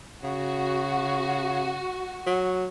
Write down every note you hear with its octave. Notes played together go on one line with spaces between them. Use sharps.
C#3 F#4
F#3